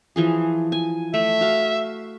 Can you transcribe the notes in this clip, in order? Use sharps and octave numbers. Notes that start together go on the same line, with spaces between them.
E3 F3 G#4
G#5
A3 E5
F#4 F5